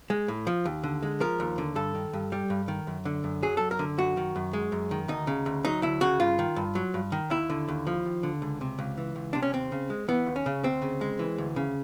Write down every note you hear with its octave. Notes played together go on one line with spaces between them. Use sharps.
G#3
A2
F3
D#2
D3
G#3
F3 A#4
D#2
D3
G2 A4
D#3
G2
G3
G2
D#3
F#2
D3
F#2
F#3 G#4
F#2 A4
A#4
D3
F#2 F#4
D#3
F#2
G#3
F#2
D#3
D2 D#4
C#3
D2
F#3 D#4
D2 E4
C#3 F#4
G2 F4
D#3
G2
F#3
G2
D#3
D#2 E4
D3
D#2
F3
D#2
D3
C#2
C3
C#2
E3
C#2
C3 D4
C#4
D#2 C4
C#3
G#3
E3 B3
D#2
C#4
C#3
D2 C4
C#3
G#3
E3
D2
C#3